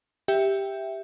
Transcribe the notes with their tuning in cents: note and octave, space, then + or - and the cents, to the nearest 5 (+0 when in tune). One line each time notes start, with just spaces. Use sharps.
G4 +5 E5 +0 G5 +0